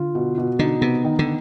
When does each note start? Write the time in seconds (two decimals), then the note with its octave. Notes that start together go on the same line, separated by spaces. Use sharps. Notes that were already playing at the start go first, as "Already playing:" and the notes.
Already playing: D3 F4
0.15 B2
0.38 B2
0.59 D3 D#4
0.81 C3 B3
1.04 D#3
1.19 D3